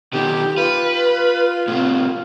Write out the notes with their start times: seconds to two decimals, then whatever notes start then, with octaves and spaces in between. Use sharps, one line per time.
0.13 B2 D#3 G4
0.58 F4 B4
1.68 A2 C3